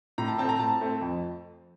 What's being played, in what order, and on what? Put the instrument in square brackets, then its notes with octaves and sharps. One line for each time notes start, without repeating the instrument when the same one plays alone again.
[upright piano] A2 A#5
A5
C4 A5
A3
A#5
A2 A5
A3 C4
F2